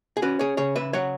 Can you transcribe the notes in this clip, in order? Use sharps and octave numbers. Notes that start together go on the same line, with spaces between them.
G#4
C#4 F#4 B4
G#4 C#5
C#3 G#4 C#5
B4 E5
F#3 C#5 F#5